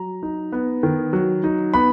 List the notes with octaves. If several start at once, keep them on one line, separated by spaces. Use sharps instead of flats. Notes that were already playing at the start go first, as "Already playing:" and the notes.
Already playing: F#3 A#5
D#4
B3
D#3
F#3
D#4
B3 B5